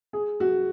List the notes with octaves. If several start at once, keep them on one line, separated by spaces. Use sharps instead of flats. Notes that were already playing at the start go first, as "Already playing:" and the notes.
G#4
F#4